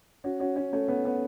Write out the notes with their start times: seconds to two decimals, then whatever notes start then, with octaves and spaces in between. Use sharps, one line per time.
0.24 C#4 F#4
0.40 C#4 F#4
0.56 C#4 F#4
0.73 A3 C#4
0.88 B3
1.05 B3